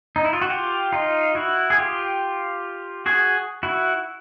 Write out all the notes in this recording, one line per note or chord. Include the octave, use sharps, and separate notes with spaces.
D#4
E4
F4
F#4
F4 G4
D#4 F4
E4 F#4
G#4
F4 G4
F#4 G#4
E4 F#4